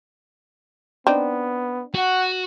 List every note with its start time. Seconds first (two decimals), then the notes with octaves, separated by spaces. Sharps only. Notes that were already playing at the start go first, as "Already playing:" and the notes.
1.07 B3 C4 D4 D#4
1.95 F#4 F#5